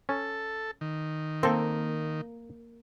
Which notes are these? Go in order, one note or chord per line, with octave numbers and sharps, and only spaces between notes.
C#4 A4
D#3
A#3 C4 A4